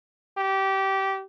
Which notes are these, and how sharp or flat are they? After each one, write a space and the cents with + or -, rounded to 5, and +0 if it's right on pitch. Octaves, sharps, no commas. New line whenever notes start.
G4 -20